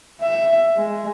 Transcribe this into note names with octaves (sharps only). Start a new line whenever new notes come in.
E5
G#3